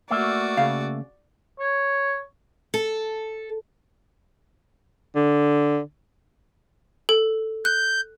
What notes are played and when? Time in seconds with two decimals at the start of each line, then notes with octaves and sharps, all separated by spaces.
0.11 A3 A#3 F#4 D5 E5
0.57 C#3 F5
1.59 C#5
2.74 A4
5.15 D3
7.09 A4
7.65 F#6 G6